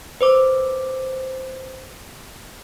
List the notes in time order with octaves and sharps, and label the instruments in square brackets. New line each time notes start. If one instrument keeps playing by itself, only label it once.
[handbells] B4 C5 D6